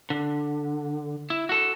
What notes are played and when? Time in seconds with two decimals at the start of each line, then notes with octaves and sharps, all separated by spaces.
0.10 D3
1.30 E4
1.49 F#4 A4